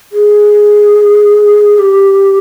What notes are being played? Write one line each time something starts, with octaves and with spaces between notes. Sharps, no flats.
G#4
G4